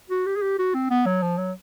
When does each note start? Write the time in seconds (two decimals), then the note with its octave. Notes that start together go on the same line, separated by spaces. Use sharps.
0.10 F#4
0.26 G4
0.36 G#4
0.42 G4
0.59 F#4
0.74 C4
0.90 B3
1.06 F#3
1.22 F3
1.38 F#3